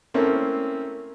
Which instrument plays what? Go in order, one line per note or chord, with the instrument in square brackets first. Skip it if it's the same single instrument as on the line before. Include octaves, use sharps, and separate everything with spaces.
[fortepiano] A3 A#3 C4 C#4 E4